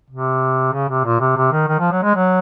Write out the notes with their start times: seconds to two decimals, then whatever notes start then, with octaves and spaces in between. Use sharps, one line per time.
0.10 C3
0.73 C#3
0.89 C3
1.05 A#2
1.20 C3
1.37 C3
1.52 D#3
1.68 D#3
1.79 F3
1.92 F#3
2.03 G#3
2.15 F#3